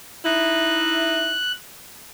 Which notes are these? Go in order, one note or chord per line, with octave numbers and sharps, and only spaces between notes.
D#4 E4 F#6